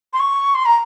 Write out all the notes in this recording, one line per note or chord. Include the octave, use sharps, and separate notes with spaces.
C6
C#6
C6
A#5